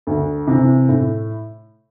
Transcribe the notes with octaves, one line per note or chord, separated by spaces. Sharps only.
D2
C3 E3
A2